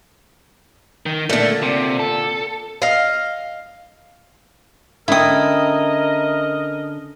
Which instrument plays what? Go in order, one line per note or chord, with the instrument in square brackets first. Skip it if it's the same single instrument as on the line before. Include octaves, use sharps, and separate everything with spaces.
[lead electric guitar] D#3
[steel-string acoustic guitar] A#2 D3 [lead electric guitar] A3
[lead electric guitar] C3
A4
[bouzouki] D#5 F5
[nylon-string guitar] D3 C#4 G5 [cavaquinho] E4 D#6 [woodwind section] A#4 D#5